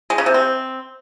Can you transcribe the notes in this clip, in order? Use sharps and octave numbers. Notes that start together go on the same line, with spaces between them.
G#3
C#3
C3
C4